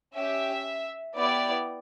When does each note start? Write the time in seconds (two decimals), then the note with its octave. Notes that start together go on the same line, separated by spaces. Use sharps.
0.14 C#4 G4 E5
1.16 B3 E4 G4 D5